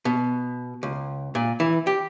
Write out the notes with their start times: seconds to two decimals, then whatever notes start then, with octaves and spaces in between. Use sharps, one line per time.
0.05 B2
0.83 C#2
1.35 A#2
1.60 E3
1.87 G4